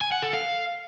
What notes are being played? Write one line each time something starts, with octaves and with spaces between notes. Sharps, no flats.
G#5
F#5
A4
F5